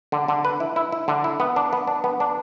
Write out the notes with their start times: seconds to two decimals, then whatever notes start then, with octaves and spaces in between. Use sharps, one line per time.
0.12 D3
0.28 D3
0.45 B4
0.60 E4
0.76 E4
0.92 E4
1.08 D3
1.24 E4
1.40 B3
1.56 D4
1.73 B3
1.87 D4
2.04 B3
2.20 D4